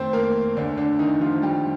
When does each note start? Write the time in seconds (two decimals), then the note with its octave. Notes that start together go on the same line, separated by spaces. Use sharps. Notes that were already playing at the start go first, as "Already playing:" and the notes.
Already playing: F2 D#3 A3 C4 C5
0.13 A#3 A#4
0.56 D2 D3 D4
0.78 D3 D4
0.99 D#3 D#4
1.21 F3 F4
1.42 G3 G4